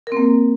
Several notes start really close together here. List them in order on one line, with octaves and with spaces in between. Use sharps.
A#4 C4 A#3